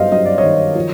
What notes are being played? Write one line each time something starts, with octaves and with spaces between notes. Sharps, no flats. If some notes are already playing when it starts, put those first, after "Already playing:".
Already playing: G1 F#2 C5 D#5 F5
F#2 D#5
D5
C#5 D#5
D#3
F3